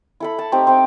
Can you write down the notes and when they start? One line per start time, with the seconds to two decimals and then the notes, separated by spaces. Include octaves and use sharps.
0.20 E4 A4 B5
0.39 A5
0.52 A3 C4 D#4 G4
0.67 C4 G5